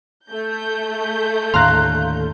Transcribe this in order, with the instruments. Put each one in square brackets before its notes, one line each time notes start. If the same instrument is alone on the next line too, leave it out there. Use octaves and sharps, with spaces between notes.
[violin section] A3 G6
[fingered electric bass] D#2 A2 D3 [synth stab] F5 A#5 [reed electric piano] C6 F#6